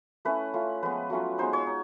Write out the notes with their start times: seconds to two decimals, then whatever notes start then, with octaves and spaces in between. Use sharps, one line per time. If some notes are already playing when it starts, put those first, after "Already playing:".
0.25 A3 C#4 E4 B4
0.54 A3 C#4 F4
0.83 F3 G#3 B3 B4
1.10 F#3 A3 C#4 F4
1.38 G#3 B3 D#4 C5
1.53 C#5
1.67 D#4